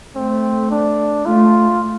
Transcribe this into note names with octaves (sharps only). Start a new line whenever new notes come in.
A3 C4
D4
A3 F4